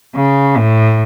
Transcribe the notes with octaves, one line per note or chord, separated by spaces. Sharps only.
C#3
A2